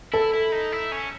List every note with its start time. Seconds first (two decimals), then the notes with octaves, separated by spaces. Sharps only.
0.13 E4 A4
0.33 E4
0.52 D#4
0.72 E4
0.92 C#4